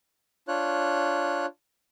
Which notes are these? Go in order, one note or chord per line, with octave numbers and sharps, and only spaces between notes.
D4 F4 C#5 F#6